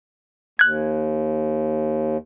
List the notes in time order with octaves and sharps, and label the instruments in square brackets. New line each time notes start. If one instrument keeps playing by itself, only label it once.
[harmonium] D#2 [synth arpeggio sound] F#6 G#6